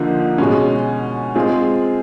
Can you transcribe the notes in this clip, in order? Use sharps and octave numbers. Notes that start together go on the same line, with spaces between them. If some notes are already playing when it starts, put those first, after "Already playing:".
Already playing: D3 F3 A#3 D#4
B2 G#3 C#4
G#3 C4 F4 G#4